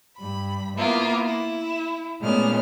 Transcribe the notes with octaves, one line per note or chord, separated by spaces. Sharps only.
G2 B5
A#3 B3 E4 F4 A#4
E4
A#2 G#3 A3 B3 C#4 F6